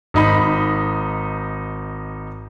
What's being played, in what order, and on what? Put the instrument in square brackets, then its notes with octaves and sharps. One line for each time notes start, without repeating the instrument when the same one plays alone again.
[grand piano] G#1 D#4 B5